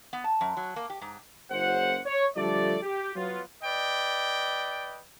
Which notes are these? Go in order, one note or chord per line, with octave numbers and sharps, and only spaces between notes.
B3
A5
F#2
F#3
A#3
G4
G#2
F#1 C5 F#5
C#5
D3 F3 G3 A3 A4 D5
G4
F#3 B3 F4
B4 D5 D#5 G5